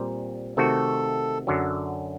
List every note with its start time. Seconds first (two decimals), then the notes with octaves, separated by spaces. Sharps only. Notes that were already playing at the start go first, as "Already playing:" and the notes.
Already playing: A#2 G3 C4
0.57 C3 D#3 A3 C4 F#4 A4
1.47 F#2 D3 F#3